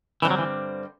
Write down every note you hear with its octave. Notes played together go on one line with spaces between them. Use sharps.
G2 D3 E3 G3 C4
F#3
E3